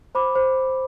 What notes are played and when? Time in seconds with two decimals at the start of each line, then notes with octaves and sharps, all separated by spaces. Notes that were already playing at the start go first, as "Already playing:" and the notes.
0.15 C5 B5 D6
0.35 C5